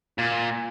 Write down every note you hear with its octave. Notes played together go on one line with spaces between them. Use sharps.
A#2